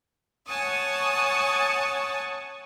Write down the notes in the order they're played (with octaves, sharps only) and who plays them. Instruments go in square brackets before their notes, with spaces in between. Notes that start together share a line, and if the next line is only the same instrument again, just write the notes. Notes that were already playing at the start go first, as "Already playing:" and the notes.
[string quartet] C#5 F#5 G#5 A5 C#6 D#6